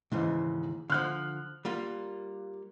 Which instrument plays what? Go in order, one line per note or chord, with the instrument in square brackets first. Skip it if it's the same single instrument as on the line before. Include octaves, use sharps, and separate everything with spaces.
[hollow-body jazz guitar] D#2 G#2 C#3 [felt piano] E3
[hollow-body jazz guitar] D3 F3 [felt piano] F6 F#6
[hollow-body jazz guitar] G3 A#3 F4